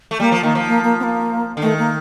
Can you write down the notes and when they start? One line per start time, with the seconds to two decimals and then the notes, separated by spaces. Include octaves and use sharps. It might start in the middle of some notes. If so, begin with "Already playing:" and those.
0.11 A3
0.20 G3 A#3
0.32 F3
0.43 D#3 A#3
0.55 F3
0.68 A#3
0.83 A#3
0.99 C4
1.03 A#3
1.57 D3
1.62 D#3 A3
1.78 A#3